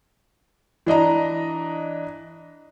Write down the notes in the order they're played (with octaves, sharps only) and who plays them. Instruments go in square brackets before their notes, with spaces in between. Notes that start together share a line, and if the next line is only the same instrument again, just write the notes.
[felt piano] E3 D4 D#5 A#5